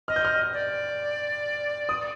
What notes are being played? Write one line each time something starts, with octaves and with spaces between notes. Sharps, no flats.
D#5 F6
G6
F6
D5
D#6